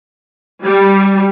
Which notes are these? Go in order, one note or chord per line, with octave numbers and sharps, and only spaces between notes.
G3